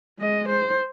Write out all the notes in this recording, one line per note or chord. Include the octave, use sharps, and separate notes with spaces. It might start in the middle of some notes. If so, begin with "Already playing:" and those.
G#3 D#5
C5